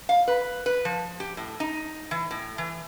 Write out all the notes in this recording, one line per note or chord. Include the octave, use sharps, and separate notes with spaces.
F5
B4
B4
F3
G4
A2
D#4
E3
A2
E3